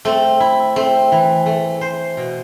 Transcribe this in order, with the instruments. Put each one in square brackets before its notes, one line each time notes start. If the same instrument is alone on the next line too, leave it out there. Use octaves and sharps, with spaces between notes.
[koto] A3 [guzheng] C4
[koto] E4
[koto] A3 [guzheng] C4
[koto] E3
A3
C5
B2